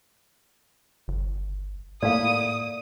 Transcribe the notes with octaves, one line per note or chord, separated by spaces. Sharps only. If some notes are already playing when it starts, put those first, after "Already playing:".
G1
A2 A3 A#3 E4 D5 F5 D#6